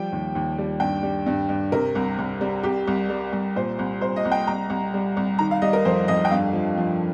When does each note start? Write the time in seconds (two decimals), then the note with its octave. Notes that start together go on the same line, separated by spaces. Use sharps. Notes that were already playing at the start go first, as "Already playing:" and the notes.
Already playing: F3 G3 G5
0.12 D#2
0.35 D#2
0.58 G3
0.80 G2 G5
1.03 G3
1.26 G2
1.49 G2
1.72 C3 A#4
1.95 C2
2.19 C2
2.41 G3
2.63 C2 G4
2.87 C2
3.09 G3
3.33 C2
3.56 A#2 C5
3.79 C2
4.01 C2 C5
4.16 D#5
4.25 C2
4.32 G5
4.47 C2 A#5
4.70 C2
4.94 G3
5.17 C2
5.39 D#3 A#5
5.51 F5
5.62 G3 D#5
5.73 A#4
5.85 F2 C5
6.08 F2 D#5
6.25 G5
6.31 G2 F5
6.53 F3
6.77 F3